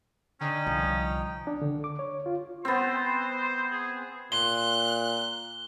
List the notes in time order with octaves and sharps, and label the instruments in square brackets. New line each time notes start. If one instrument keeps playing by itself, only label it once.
[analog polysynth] D3 [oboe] C#4 [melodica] D#4 G5
[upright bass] C2 [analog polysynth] F3
[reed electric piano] D4
D3
D6
C#5
F4
[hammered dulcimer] B3 C4 [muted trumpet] C5
[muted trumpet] G#4
[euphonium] A#2 [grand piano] C6 [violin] F#6 [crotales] G7